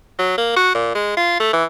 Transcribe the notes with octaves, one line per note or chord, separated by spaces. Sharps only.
F#3
A#3
F#4
A#2
G#3
F4
A3
E3